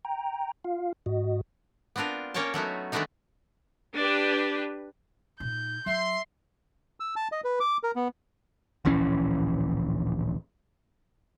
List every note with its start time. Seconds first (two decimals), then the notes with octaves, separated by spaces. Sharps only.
0.05 G5 A#5
0.64 F4 F5
1.06 G#2 F#4 D#5
1.96 B3 C4 D4 F4 A#4
2.34 A#3 C#4 A#4 C#5 G5 A5
2.54 F#3 A3 B3 D#4
2.92 D#3 G#3 A3 B3 D4 D#4
3.97 D4 G4 B4
5.40 A#2 D#4 G6
5.86 F#3 E5 C6
7.00 E6
7.16 A5
7.32 D#5
7.44 B4
7.60 D6
7.83 A#4
7.95 B3
8.85 D1 A#1 E3 C#4